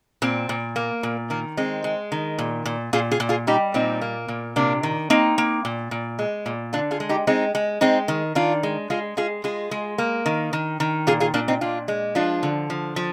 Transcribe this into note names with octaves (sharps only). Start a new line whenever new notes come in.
A#2 C4
A#2
A#3
A#2
D#3 A#3
G#3 C4
G#3
D#3
A#2
A#2
A#2 F4 G#4
F4 G#4
A#2
F4 G#4
G3 D#4 G4
A#2 C4 D#4
A#3
A#2
C3 A#3 D4
D#3
A#3 C4 D#4
A#3
A#2
A#2
G#3
A#2
D3 D4 F4
F4 G#4
G#3
D#4 G4
G#3 C4 D#4
G#3
G#3 C4 D#4
D#3
D#3 D4 F4
G#3
G#3 F4 G#4
G#3 F4 G#4
G#3 F4 G#4
G#3
A#3
D#3
D#3
D#3
A#2 F4 G#4
F4 G#4
A#2 A#3 D4
C4 D#4
A#2 D4 F4
G#3
F3 D4 F4
D3
F3
F3